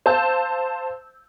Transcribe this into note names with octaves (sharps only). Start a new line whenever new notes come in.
C5 F5 A5 E6 G6